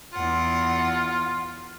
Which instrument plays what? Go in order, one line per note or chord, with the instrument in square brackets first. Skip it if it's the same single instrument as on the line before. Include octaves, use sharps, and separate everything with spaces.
[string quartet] E2 F#5 [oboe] F4